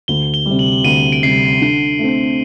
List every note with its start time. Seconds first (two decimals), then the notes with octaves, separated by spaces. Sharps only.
0.08 D2 G7
0.34 G7
0.46 C3 G3
0.59 F#7
0.84 D2 D#7
1.12 D7
1.23 C3 G3 C7
1.61 D3
1.99 A3 C4